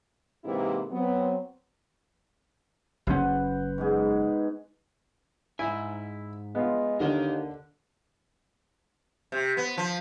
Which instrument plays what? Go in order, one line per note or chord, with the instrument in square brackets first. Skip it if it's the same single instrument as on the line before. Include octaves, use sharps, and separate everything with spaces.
[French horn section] G#2 C3 E3 A#3 C4 E4
F#3 B3 C4
[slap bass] F#1 C#4 [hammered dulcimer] B4 C5 F#5
[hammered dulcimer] G#2 B3 G#4
[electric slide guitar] G#2 G#5 [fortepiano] E4
[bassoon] G#3 [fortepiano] B3 F4
[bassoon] D#2 [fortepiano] D3 [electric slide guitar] A#4 D#5
[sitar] C3
B3
F3